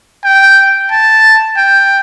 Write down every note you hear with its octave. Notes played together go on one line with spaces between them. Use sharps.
G5
A5
G5